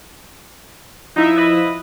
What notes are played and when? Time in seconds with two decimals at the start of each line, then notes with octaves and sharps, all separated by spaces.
1.16 F3 D#4 E4 E5
1.36 B4 D#5